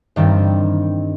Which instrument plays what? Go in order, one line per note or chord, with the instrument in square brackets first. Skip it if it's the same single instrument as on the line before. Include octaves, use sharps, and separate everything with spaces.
[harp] G2 D#3 G3 C4